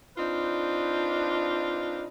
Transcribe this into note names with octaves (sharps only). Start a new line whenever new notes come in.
C4 D4 D#4 F4 B4